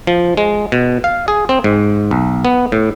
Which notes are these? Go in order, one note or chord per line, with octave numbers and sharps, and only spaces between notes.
F3
G#3
B2
F5
G#4
C4
G#2
B1
B3
A2